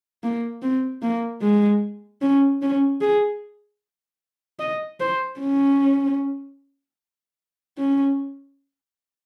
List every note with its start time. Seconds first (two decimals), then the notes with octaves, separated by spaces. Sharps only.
0.23 A#3
0.62 C4
1.02 A#3
1.42 G#3
2.22 C#4
2.62 C#4
3.01 G#4
4.59 D#5
5.00 C5
5.40 C#4
7.78 C#4